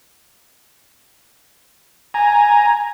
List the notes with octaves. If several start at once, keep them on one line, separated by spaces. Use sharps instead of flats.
G#5 A#5